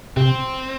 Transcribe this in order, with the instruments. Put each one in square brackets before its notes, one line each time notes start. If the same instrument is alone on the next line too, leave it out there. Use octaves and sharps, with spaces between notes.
[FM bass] C3 [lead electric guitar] C4